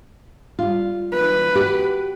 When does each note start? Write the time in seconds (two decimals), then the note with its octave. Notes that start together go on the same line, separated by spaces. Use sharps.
0.59 G3 F4
1.14 B4
1.55 F#4 G4